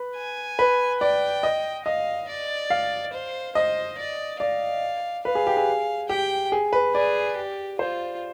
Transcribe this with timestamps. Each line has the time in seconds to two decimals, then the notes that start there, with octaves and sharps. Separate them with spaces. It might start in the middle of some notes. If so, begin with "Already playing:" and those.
Already playing: B4
0.16 G#5
0.59 B4
1.00 D5 G5
1.43 D#5
1.85 D#5 F5
2.29 D5
2.70 F5
3.13 C5
3.55 C5 D#5
3.98 D5
4.40 D5 F5
5.24 B4 F5
5.35 G#4
5.47 G4
5.57 G#4
6.09 G4 G5
6.52 G#4
6.73 B4
6.95 G#4 D5
7.36 G4
7.79 F4 C5